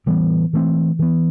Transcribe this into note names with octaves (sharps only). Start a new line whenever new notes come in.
A2 E3 G3 B3
E3 A3 C4
E3 B3